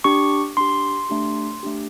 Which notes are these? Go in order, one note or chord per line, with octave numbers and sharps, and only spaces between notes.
D4 G4 C#6
D4 G4 C6
A3 D4 G4
A3 D4 G4